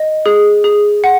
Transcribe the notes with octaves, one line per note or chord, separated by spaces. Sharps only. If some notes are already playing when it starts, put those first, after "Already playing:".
Already playing: D#5
G#4
G#4
F#5